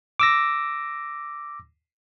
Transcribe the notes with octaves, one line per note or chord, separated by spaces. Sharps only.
D6 E6 A#6